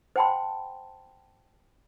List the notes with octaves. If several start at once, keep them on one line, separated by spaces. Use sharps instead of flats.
C5 F#5 G5 A5 B5 C6